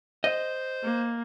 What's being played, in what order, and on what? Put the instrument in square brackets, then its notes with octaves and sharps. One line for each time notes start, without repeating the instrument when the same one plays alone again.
[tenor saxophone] C5 [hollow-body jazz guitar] D#5
[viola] A#3